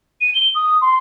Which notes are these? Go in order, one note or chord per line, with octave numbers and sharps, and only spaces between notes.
D#7
G7
D#6
C6